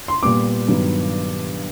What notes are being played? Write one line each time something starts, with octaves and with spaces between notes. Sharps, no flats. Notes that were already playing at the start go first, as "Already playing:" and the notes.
C6
A#2 G3 B3 D6
G2 D#3 F#3 B3